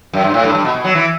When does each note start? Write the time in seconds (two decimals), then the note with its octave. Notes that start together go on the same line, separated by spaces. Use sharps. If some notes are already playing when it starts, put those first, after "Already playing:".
0.13 F#2
0.24 G2
0.34 A2
0.44 G2
0.55 G2
0.65 B2
0.75 B2
0.84 F#3
0.95 E3